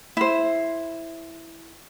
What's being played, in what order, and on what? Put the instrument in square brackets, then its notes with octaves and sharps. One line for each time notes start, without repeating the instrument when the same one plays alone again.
[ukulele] E4 C5